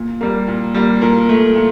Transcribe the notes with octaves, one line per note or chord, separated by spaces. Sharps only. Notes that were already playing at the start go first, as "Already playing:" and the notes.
Already playing: A#2
G3 A#3
A#2
G3 A#3
A#2 A#4
A3
A#2